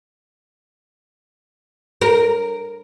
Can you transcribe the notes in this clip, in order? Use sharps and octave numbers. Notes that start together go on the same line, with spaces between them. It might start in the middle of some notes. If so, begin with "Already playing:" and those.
A#4